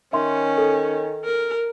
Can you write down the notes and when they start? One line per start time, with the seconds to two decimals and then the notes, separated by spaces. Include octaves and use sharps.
0.13 D#3 C#4 E5 C6
0.58 A4
1.25 A#4